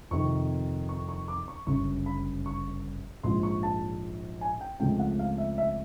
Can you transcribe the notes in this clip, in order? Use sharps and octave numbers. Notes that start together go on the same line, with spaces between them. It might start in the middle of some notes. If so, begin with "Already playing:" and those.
F2 C3 D#3 C#6
C#6
C#6
D6
C#6
G1 F#2 C#3 C#6
B5
C#6
A#1 G#2 F3 C6
C#6
A5
G#5
G5
C#2 C#3 F3 A3 C4 G5
F#5
F5
E5
E5